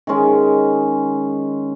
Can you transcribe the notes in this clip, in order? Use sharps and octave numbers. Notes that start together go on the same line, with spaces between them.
D#3 G#3 C#4